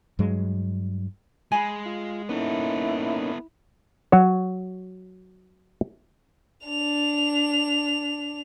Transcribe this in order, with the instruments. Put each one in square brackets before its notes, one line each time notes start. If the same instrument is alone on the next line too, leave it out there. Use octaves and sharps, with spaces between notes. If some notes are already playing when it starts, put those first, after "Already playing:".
[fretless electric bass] G2 F#3 G#3
[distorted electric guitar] G#3 [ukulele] G#5 B5
[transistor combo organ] F4
[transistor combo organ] A#3 C#4 D#4 [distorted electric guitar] B3 A4 [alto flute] E4
[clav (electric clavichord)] F#3 F#4 C#5
[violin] D4 F7